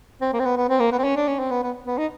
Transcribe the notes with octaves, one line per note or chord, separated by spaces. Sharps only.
C4
A#3
C4
B3
B3
C4
A#3
B3
C4
C#4
D4
C#4
C4
B3
B3
B3
D#4